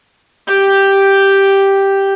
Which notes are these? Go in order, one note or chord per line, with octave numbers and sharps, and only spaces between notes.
G4 G5